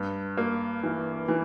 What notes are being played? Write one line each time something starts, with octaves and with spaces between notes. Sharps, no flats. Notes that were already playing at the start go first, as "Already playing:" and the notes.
Already playing: G2
A#3
E3
E3